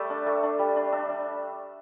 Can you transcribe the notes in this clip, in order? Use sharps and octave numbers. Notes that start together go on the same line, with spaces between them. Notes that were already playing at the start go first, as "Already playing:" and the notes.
Already playing: G3 A3 D5 E5
D4
A3
D4
G3
D4
D4 E5
D4